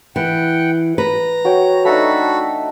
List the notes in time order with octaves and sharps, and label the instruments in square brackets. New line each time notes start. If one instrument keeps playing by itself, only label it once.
[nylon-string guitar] E3 [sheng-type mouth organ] F#5 G5
[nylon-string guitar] B4 [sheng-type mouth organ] A#5
[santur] F#4 C#5 G5
[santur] A3 D4 D#4 [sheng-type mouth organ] F#4 A4 B5